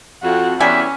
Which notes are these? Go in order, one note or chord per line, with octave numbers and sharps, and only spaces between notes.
F2 F#4
E2 G3 C#4 E5 G#5